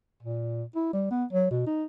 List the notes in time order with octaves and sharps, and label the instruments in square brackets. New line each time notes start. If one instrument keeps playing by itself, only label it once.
[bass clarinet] A#2
E4
G3
B3
F#3
B2
D#4